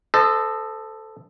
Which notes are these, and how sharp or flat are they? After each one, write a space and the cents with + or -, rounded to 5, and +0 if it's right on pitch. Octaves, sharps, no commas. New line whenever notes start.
A4 +0 C5 -35 D#5 -25